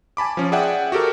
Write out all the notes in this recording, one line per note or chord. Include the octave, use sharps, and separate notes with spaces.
G#5 A5 B5 D6
F3 C#4
G#4 D5 E5 F#5 G5
F#4 G4 A4 A#4